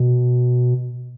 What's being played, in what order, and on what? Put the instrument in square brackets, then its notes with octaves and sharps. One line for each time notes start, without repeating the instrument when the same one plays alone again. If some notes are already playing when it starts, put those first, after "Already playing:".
Already playing: [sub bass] B2